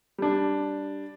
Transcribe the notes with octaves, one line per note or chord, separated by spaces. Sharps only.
G3 D4